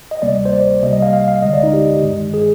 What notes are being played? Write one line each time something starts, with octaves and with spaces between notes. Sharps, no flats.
D#5
D2 C3 G3 A#3 D5
C5
D5
C2 C3 G3 A#3 D#5
D#5
F5
F5
F5
D2 D3 G#3 D#5
D5
D#4
G4
G#1 G2 D#3 G#3
G#4